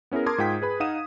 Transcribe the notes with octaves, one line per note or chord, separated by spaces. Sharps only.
B3 C#4 E4 G#4 A#4
A#4 A5 C6 D6 D#6 G#6
G#2 F4 G5 B6
G#4 B4 B5
D#4 F5 F#5 D#6 D#7 E7